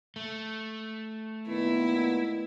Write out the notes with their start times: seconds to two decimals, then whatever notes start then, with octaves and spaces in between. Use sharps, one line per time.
0.16 A3
1.47 A#2 D#3 B3 E4